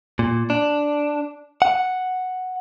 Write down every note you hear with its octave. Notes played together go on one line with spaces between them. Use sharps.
A#2
D4
F#5